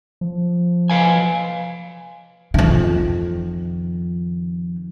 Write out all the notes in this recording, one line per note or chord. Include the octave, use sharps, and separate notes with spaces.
F3
B4 F5 G#5
F2 D#3